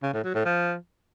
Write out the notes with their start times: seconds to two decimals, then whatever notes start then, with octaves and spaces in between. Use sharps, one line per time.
0.03 C#3
0.13 A2
0.24 F#3
0.34 A2
0.45 F3